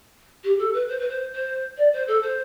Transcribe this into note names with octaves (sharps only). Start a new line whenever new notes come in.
G4
A4
B4
C5
B4
C5
C5
D5
C5
A4
C5